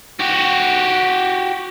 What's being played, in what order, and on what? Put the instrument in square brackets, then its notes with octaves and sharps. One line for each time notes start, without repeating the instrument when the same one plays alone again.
[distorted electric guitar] F#4 G4